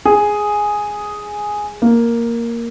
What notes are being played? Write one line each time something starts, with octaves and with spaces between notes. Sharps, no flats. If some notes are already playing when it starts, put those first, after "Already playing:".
G#4
A#3